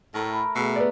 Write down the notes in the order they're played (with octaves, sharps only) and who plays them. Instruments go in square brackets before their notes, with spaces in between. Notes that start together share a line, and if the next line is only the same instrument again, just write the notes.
[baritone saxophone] A2 [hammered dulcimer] A3 A#4
[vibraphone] B5
[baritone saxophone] B2 [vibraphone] A3 G#4 A4 [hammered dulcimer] E5
[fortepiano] B3 D5